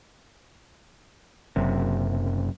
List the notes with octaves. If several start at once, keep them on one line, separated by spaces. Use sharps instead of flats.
F#1 F#2 C3